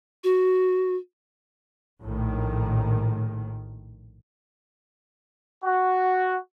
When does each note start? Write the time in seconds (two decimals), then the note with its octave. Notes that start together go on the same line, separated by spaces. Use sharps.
0.24 F#4
2.01 A#1 A2 D#3
5.64 F#4